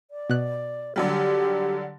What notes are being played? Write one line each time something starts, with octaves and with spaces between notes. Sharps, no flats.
D5
B2 F#6
D3 F#3 G3 G4